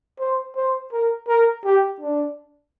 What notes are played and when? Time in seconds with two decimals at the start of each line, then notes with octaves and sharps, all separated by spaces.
0.20 C5
0.56 C5
0.92 A#4
1.28 A#4
1.64 G4
2.00 D4